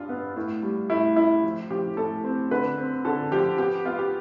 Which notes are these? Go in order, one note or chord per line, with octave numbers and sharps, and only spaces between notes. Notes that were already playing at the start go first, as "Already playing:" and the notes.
Already playing: G2 D4 F4
B3
A2
G3
A2 E4
A2 E4
F3
F3 G4
A2 A4
C4
D3 B4
C4
D3 A4
F3 G4
B3 G4
B3 F4
G4